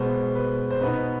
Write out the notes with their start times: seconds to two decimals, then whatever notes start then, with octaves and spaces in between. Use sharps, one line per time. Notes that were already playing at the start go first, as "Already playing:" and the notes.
Already playing: B2 G#3 B3 C5
0.35 B4
0.71 C5
0.81 B2 B3 D#4 B4